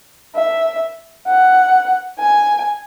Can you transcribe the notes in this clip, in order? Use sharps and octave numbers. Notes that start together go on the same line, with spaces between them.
E5
F#5
G#5